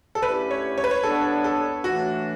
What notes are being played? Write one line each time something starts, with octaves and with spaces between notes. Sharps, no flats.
A4
D3 A3 C#4 E4 G4 B4
C#5
C#5
B4
C#5
D3 G3 B3 D4 A4
A4
A2 E3 A3 D4 F#4